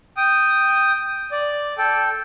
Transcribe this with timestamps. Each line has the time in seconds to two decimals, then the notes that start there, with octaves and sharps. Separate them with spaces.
0.17 G5 D#6
1.32 D5
1.78 A4 G5